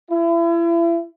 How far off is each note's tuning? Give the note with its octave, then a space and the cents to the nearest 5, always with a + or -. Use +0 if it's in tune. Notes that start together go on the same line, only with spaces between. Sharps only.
E4 +35